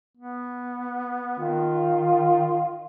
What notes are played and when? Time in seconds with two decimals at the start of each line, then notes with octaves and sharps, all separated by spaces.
0.17 B3
1.39 D#3 F4